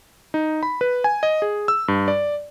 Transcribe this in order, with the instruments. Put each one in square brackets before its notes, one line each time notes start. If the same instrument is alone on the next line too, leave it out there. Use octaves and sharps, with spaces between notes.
[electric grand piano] D#4
B5
B4
G#5
D#5
G#4
E6
G2
D5